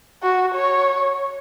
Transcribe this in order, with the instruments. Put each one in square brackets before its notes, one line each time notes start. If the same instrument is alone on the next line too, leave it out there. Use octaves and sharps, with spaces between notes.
[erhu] F#4
C#5